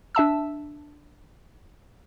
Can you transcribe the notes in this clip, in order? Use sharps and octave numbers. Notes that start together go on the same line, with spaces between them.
D4 E5 A5 E6